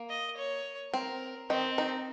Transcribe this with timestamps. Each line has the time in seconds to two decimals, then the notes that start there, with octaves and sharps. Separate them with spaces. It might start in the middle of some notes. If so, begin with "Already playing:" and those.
Already playing: A#3
0.09 D#5
0.37 C#5
0.93 C4 A#4
1.50 D#3 C4 D#4
1.78 D#3 D#4